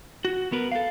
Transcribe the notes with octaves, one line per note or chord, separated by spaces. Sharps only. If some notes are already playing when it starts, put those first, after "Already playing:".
F#4
B3 A#4 B4
A4 F5